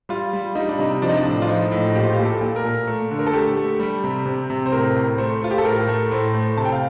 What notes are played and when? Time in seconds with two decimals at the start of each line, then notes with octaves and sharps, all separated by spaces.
0.09 G3 F4
0.33 G3
0.55 G3 D#4
0.69 D4
0.79 C3 D#4
1.02 F3 D4
1.09 D#4
1.17 D4
1.25 A2
1.42 F4
1.48 F3 D#4
1.72 A2
1.95 A#2 G4
2.04 F4
2.13 A#2 G4
2.25 A4
2.41 A#2
2.56 A#4
2.64 A#2
2.87 A3
3.11 D3
3.19 A#4
3.27 A4
3.33 A3 G4
3.57 A3
3.80 G3
4.04 C3
4.26 C3
4.50 C3
4.66 C5
4.72 A2 A#4
4.95 A2
5.18 A3 C5
5.42 A3 F4
5.51 G4
5.58 A4
5.65 A2 A#4
5.88 A3
6.11 A2 C5
6.34 A3
6.57 C3 A5
6.65 G5
6.72 F5